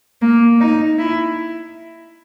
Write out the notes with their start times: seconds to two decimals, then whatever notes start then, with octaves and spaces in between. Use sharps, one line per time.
0.22 A#3
0.61 D#4
0.98 E4